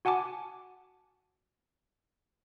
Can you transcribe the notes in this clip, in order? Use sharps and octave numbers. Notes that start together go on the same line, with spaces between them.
F#4 F#5 G#5 A5 D6